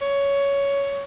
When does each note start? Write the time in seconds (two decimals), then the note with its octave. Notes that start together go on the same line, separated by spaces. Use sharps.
0.01 C#5